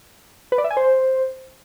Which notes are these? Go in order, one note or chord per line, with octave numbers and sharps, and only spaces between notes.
B4
D5
E5
G#5
C5